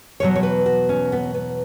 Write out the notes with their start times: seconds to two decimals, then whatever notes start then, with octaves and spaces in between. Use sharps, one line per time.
0.20 E2 B2 F#3 C#5
0.36 C#5
0.43 B4
0.66 F#4
0.89 C#4
1.12 B3
1.34 B3